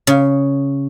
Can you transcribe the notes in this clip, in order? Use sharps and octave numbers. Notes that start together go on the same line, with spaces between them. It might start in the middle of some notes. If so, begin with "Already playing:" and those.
C#3